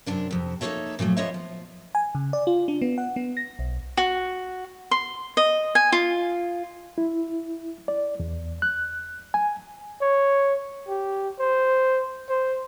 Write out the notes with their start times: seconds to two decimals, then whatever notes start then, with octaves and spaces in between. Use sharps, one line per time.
0.06 F#2 C3 D4 A#4
0.31 F2 C3
0.61 A#3 D#4 F4 A4 C#5 E5
0.99 A#2 F3 F#3 A3
1.17 F2 B3 F4 C#5 D#5 E5
1.34 F3
1.95 G#5
2.15 C#3
2.33 D5
2.47 F4
2.68 D4
2.82 B3
2.98 F#5
3.16 B3
3.37 A#6
3.59 B1
3.97 F#4
4.91 C6
5.37 D#5
5.75 G#5
5.92 F4
6.98 E4
7.88 D5
8.20 E2
8.62 F#6
9.34 G#5
10.01 C#5
10.88 G4
11.39 C5
12.29 C5